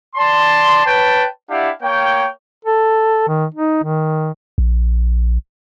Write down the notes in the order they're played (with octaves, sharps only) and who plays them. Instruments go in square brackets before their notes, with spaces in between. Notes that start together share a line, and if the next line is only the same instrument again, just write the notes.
[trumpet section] D5 A5 C6
B4 C#5 G5 A5
D4 E4 G4 F5 F#5
A#3 C#5 G5
[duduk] A4
D#3
D#4
D#3
[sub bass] A#1